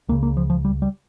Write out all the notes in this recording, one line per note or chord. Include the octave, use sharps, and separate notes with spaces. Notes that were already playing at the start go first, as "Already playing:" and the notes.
C#2 C#3 A#3
A#3
F3
F3
G3
G3